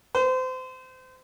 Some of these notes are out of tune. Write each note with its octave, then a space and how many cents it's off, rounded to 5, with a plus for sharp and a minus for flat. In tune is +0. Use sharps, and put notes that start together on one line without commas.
C5 -30